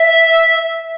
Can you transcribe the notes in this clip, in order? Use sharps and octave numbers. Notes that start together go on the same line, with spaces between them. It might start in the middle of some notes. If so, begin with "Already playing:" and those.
Already playing: E5